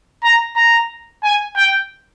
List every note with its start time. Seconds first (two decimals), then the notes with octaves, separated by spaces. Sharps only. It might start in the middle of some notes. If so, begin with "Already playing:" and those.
0.24 A#5
0.56 A#5
1.24 G#5
1.57 G5